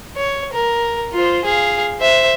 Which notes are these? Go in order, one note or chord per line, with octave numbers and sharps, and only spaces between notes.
C#5
A#4
F4 C5
G#4 F5
C5 E5